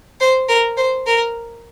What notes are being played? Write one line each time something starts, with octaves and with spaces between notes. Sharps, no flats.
C5
A#4
C5
A#4